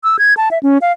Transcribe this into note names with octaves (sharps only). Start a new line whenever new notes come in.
E6
G#6
A5
E5
C#4
F5